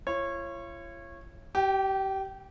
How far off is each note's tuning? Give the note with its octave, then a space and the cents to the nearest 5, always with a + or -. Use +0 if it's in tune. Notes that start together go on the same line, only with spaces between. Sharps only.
F4 -45 C#5 -20
G4 -25 G5 +15